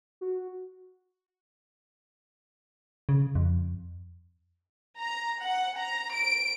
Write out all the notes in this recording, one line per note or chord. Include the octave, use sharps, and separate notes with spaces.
F#4
C#3
F2
A#5
F#5
A#5
D7